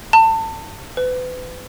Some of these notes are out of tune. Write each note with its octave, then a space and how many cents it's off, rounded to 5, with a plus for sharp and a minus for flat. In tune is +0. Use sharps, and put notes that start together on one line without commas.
A5 +30
B4 +35